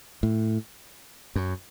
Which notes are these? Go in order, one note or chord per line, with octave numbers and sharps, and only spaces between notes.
A2
F#2